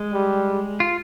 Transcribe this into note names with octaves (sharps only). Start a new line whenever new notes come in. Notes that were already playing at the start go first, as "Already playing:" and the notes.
Already playing: G#3
G3
F4